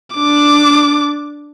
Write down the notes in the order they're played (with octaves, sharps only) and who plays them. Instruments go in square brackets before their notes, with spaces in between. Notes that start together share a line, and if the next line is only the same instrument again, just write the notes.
[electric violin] D4 D6